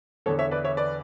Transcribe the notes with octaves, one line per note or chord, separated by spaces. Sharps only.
E2 D3 A4 C#5
C#5 E5
B4 D5
C#5 E5
B4 D5